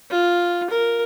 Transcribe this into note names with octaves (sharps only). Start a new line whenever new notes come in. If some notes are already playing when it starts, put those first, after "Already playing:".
F4
A#4